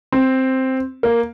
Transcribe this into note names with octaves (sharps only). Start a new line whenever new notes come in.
C4
A#3